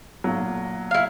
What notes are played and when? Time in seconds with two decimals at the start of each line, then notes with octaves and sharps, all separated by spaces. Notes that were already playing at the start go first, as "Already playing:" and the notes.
0.24 B1 A#2 F#3
0.91 E4 F5